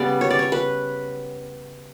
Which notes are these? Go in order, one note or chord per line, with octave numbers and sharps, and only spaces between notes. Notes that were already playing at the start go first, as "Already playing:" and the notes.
Already playing: C#3 G3 B3 B4 D5
C#5
D5
C#5
B4